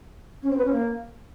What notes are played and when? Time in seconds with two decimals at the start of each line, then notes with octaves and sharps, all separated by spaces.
0.42 C#4
0.49 C4
0.57 B4
0.64 C#4
0.72 A#3